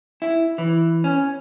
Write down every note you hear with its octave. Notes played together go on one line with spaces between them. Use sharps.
E4
E3
C#4